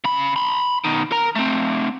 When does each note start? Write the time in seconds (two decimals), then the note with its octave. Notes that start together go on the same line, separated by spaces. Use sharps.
0.04 C#3 B5
0.36 B5 C6
0.84 B2 D#3
1.12 A#4 A#5
1.36 A3 C4